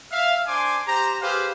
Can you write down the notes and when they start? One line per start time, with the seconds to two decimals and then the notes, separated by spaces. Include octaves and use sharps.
0.11 E5 F5
0.47 D4 C5 G#5 C6 D6
0.87 G4 C5 A#5
1.21 G4 G#4 B4 C5 F5